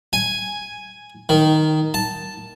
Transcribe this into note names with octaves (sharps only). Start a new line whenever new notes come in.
G#5
D#3
A5